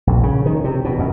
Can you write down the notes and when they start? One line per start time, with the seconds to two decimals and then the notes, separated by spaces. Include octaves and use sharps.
0.07 A#1
0.23 C#3
0.46 D#3
0.64 C3
0.85 B2
0.99 F#2